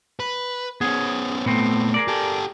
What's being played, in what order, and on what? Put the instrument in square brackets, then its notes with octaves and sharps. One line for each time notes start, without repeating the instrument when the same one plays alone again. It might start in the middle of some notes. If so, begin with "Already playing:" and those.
[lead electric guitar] B4
[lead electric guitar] B3 C#4 [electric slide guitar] G#4
[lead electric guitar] A#2 A3 [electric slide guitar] B3 C4
[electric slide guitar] G#4 A#4 D5
[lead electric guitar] G4 A4